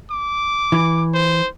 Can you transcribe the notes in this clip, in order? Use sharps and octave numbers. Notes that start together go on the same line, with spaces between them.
D6
E3
C5